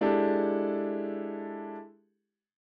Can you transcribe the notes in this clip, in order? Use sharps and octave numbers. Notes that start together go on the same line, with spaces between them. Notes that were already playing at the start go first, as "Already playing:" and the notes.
G#3 D4 E4 G4 A4